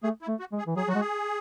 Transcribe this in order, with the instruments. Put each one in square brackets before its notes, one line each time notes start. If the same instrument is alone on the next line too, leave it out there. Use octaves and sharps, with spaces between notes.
[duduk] A3 [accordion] G#4
[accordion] E4
[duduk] A3
[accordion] F#4
[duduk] G#3
[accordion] G#4
[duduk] E3
[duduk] F#3 [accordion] G#4
[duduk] F#3 [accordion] F#4
[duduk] G#3
[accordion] G#4